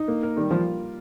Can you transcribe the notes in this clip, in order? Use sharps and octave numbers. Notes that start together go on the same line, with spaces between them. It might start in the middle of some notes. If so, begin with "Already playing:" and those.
Already playing: D#4
A#3
A#4
D#3 G3
F3 F4